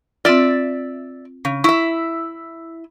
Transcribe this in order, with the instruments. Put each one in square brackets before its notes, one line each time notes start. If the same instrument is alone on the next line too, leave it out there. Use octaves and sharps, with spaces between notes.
[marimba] C4 F4 [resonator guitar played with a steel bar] D5 E5
[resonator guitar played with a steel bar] C#3
[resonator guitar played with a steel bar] E4 E5 [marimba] C#6